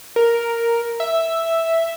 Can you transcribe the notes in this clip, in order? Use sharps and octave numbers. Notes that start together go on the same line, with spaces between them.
A#4
E5